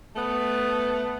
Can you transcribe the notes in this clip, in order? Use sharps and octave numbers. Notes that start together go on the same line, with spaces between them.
A3 B3